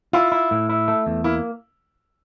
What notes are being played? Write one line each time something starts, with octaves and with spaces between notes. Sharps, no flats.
E4 F4
E4
A2
E4
A3
E2
A#3 E4